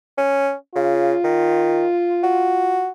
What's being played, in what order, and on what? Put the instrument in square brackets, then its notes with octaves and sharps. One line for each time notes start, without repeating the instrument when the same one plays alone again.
[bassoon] C#4
[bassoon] C#3 [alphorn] F4
[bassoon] D#3
F#4